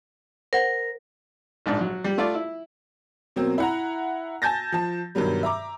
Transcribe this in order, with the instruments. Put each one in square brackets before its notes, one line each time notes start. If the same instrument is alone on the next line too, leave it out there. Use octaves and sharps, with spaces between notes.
[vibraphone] A#4 [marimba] C5 F#5
[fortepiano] A#1 G#2 D4
F#3
G3
A3 F4 D5 D6
E4
[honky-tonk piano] B2 F#3 A#3 C4
E4 F#5 A#5
G#5 A5 G6 A6 A#6
F3 A5
G2 B2 D#3 F#3 G3
E5 A#5 D6